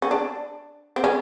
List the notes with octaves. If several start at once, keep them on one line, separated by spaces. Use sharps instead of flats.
C#4
D4
C4
C#4